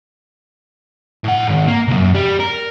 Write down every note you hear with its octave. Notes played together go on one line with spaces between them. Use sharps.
A2 F#5
G#2 D#3
A#3
C2 F#2
G3
A#4